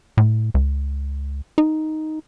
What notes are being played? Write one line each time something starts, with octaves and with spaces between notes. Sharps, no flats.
A2
C#2
D#4